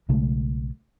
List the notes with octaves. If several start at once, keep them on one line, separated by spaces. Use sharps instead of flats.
B1 C#3 G#3 A3